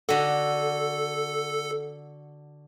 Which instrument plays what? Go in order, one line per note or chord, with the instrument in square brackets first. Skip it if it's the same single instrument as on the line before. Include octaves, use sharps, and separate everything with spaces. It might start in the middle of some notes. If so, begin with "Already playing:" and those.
[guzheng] D3 F#4 [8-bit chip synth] A4